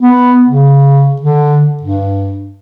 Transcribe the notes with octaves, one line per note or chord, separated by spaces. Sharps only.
B3
C#3
D3
G2